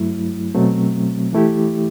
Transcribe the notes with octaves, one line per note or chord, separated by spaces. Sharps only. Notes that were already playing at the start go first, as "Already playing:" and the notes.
Already playing: G2 F#3 A3 E4
B2 F#3 A3 C4
E3 A3 E4 G4